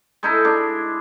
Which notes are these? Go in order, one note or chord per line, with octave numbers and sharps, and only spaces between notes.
G#3 D#4 E4 A4
G#3 D4